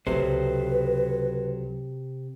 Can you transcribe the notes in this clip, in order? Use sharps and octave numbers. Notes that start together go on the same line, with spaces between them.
C#2 C3 F#3 A4 B4 C5